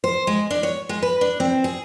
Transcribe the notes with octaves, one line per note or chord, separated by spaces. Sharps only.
C5
G#3
D4
C#5
G#3
B4
D4
C4
G#4